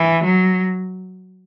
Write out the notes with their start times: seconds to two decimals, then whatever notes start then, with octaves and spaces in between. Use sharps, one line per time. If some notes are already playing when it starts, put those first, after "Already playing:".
Already playing: E3
0.25 F#3